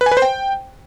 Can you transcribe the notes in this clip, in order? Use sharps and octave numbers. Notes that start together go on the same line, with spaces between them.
B4
G#5
B4
C5
G5